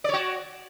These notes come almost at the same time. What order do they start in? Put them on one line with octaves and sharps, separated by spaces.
D5 C#5 F#4